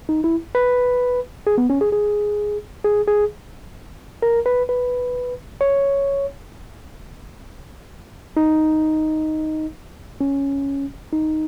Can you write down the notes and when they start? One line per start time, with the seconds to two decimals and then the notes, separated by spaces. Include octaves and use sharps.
0.09 D#4
0.24 E4
0.55 B4
1.47 G#4
1.58 B3
1.70 C#4
1.81 G#4
1.92 G#4
2.84 G#4
3.08 G#4
4.22 A#4
4.46 B4
4.69 B4
5.61 C#5
8.37 D#4
10.21 C#4
11.13 D#4